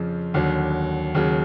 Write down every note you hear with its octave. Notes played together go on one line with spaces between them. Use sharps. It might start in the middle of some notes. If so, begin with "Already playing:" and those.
Already playing: F2 C#3 F3
D#2 D3 F#3
D#2 C#3 F#3